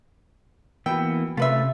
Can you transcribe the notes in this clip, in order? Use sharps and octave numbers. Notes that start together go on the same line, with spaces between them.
E3 A#3 B3 F#4 G5 B5 E6
C3 A3 C#4 F4 B4 E5